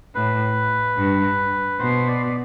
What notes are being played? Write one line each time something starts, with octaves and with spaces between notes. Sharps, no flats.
A2 B4
G2
B2 C5
D5